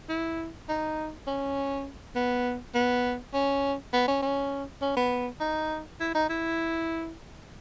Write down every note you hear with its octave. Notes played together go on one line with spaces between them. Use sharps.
E4
D#4
C#4
B3
B3
C#4
B3
C#4
C#4
C#4
B3
D#4
E4
D#4
E4